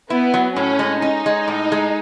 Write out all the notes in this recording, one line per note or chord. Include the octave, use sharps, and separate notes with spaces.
B3 E4
F#3
A2 C#4
G#3
C#4 D#4
G#3
A2
G#3